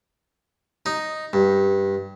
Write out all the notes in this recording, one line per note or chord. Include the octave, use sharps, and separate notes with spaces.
D#4
G2